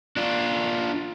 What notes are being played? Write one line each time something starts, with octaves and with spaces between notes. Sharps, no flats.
D4 F4